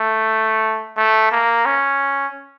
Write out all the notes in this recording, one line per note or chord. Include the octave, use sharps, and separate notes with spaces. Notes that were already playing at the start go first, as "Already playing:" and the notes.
Already playing: A3
A3
A#3
C#4